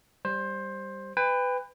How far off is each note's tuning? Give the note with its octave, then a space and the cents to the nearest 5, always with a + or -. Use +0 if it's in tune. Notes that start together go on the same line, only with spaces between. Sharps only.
G3 +0 C5 +15
B4 +20 G5 +35